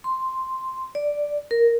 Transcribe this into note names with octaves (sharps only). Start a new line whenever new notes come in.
C6
D5
A#4